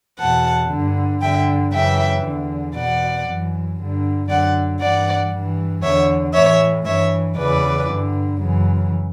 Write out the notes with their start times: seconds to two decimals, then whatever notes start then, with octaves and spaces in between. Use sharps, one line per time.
0.19 E2 B2 F#5 A5
0.70 G2 D3
1.21 G2 D3 E5 G5
1.73 F#2 C#3 E3 E5 G5
2.24 E2 D3
2.75 E2 B2 D5 F#5
3.27 F#2 E3
3.79 G2 D3
4.29 F#2 D3 D5 F#5
4.81 G2 E3 D5 F#5
5.33 G2 E3
5.83 E2 D3 C#5 E5
6.34 A2 E3 C#5 E5
6.86 G2 E3 C#5 E5
7.37 E2 C#3 E3 B4 D5
7.89 G2 D3
8.40 F#2 C#3 E3